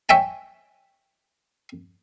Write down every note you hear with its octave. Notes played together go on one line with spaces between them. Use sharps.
C#5 E5 G5 G#5